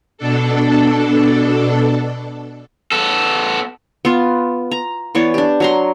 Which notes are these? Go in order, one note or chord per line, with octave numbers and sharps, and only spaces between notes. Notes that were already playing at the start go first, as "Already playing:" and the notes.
B2 D4 A4
B3 A4
B3 F4
A#5
E3 B3 C#5 D5
D4 G4
F#3 A#5 C6